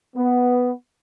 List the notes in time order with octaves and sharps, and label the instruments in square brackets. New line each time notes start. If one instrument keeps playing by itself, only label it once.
[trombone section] B3